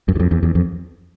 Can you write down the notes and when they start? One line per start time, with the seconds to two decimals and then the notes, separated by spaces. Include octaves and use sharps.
0.08 F#2
0.16 E2
0.20 F2
0.31 E2
0.43 E2
0.55 F2